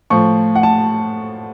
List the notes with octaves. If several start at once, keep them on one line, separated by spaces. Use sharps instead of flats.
A2 F3 C#6
F#5
A5